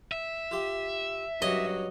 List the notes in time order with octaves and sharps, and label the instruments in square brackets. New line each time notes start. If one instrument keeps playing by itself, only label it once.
[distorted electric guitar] E5
[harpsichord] F4 G4 C6
[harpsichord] G2 C#4 G#5 [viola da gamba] F#3 [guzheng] D#5